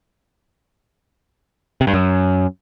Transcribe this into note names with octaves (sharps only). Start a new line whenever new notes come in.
C3
G2
F#2